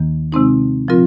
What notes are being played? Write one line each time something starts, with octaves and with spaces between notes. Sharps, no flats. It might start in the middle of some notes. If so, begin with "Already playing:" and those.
Already playing: D#2 D#3 A#3
C3 G#3 C4 D#4
A#2 F3 C4 F4 A#4